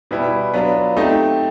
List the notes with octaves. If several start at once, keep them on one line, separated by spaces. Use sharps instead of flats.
B2 G3 B3 E4
F#3 B3 D4 F4
A3 C4 D#4 G4